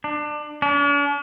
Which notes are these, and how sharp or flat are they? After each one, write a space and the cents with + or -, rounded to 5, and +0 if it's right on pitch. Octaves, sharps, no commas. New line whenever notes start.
D4 +25
D4 -45